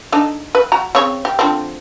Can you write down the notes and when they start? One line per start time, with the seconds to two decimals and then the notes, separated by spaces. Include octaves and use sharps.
0.12 D4 D#4 A4
0.55 B4
0.72 F#4 A#5
0.95 C#3 C4 C#5
1.25 G4
1.39 D3 F3 C4